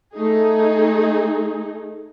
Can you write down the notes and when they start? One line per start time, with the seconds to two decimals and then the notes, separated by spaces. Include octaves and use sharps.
0.14 A3 D#4 G#4